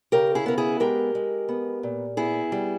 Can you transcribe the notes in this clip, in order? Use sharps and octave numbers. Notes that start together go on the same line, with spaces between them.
C#3 G4 A#4
E4 G#4
B3 A#4
E4 G#4
G#3 G4 A#4
G#3
B3
A#2
B3 E4 G#4
G3